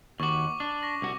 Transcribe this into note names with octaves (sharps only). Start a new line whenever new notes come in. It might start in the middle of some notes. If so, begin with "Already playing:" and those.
D#2 F#4 C#6 D6
D4 D6
C#6 A#6
C2 F#4